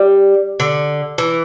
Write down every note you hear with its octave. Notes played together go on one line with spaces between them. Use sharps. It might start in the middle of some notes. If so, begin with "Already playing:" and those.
Already playing: G3
D3
E3